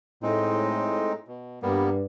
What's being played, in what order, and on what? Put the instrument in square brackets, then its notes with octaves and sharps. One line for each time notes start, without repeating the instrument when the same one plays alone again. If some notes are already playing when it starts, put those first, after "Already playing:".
[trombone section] A2 [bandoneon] G#3 C4 D#4
[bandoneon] B2
[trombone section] G2 [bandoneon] G3 A#3 B3